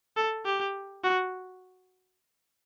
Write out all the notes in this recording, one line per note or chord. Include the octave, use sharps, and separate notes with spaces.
A4
G4
F#4